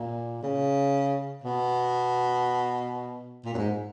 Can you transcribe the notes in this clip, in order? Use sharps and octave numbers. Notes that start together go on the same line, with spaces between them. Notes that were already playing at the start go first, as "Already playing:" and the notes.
Already playing: A#2
C#3
B2
A#2
F#2
G#2